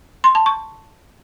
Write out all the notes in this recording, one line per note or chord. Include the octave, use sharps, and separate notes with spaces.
C6
A5
C#6